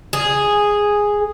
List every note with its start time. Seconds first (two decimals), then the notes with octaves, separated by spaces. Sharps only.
0.13 G#4